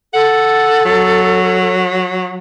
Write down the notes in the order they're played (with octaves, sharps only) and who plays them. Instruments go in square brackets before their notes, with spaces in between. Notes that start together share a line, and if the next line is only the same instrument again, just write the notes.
[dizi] A4 [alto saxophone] F#5
[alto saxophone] F#3